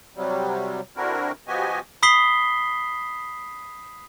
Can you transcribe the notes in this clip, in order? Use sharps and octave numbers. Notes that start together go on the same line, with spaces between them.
C3 F#3 G3
D3 C4 D4 E4 F#4 A#4
F3 B3 F#4 G4 D#5 G#5
B5 D#6 B6 C7 G7